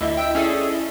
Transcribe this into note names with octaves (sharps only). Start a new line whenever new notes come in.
D2 E4 D#5 E5
G5 E6
C#4 G#4 A4 D5
D#5